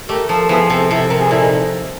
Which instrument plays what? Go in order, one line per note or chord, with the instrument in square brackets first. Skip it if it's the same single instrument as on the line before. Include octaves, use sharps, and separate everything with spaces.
[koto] A3 [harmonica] G4 A#4
[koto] F3 [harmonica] A4
[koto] F3 [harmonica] B3 E4 G#4
[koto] C3 [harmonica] A4
[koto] C3 [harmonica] E4 A4
[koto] C3 [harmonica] A#4
[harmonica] G#4
[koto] A#2 [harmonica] E4 A4
[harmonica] D#4